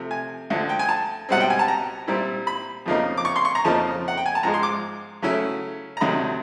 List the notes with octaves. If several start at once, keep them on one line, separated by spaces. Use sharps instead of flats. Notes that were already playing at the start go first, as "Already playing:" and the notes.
Already playing: C3 F3 A3
G#5
D2 D3 F3
G5
G#5
A5
C#2 B2 G3 C4 F#5
G5
G#5
A5
A#5
A#2 G3 C4 E4
B5
F2 C#3 F3 A#3 D#4
D6
C#6
C6
C#6
A#5
F2 C#3 F3 A#3 D#4 A5
F#5
G5
G#5
A5
G#2 F3 G#3 A#5
C6
D6
C#3 F#3 A3 C#4 E4
A#5
D2 C3 D#3 F#3 B5